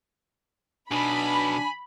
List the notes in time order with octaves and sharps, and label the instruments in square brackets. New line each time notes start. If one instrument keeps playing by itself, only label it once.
[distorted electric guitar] B1 B2 [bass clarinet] D4 [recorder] G#5 [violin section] B5